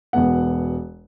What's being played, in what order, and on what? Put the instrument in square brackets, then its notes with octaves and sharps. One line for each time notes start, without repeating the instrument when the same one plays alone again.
[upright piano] E1 B2 B3 F#5